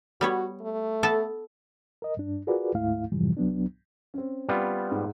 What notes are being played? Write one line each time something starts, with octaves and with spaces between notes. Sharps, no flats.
G3 B3 F#4 C#5
A3
B3 A4 A5
A#4 D#5
G2 D4
F4 F#4 G#4 A#4 B4 D5
D2 G#2 A3 E4 F5
F2 G#2 C3 E3 F3 G3
C2 F#3 B3 D4
C4 C#4
G3 B3 F4
G#2